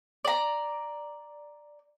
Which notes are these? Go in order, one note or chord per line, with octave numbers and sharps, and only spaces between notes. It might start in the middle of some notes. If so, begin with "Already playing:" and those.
D5 A#5